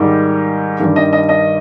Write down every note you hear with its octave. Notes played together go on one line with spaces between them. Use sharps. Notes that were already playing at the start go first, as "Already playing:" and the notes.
Already playing: G#2 D#3 G3
G2 D#3 G3
D#5
D#5
D#5